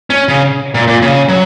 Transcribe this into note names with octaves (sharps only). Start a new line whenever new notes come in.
C#4
C#3
A#2
A#2
C#3
F#3